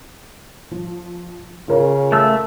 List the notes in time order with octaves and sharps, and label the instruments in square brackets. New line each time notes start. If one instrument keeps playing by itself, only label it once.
[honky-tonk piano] F3
[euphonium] C#3 [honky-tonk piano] F4 A#4 C#5
[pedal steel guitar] A3 E6